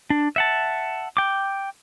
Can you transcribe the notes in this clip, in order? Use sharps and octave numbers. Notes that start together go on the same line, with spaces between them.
D4
E5 F#5 A5
G5 D6